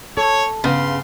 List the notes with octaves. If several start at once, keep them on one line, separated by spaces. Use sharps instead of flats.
A4 C#5
G2 C#3 B3 F5 C6